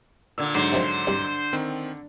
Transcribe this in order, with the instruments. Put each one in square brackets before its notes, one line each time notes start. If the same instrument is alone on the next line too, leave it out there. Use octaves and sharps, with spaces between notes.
[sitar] A#2 D3 [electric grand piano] E6
[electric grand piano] G#2 F#3 C7 [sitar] D3 [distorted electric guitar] C5
[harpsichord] C3 D#3 F3
C2 G2
[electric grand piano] D#3 C4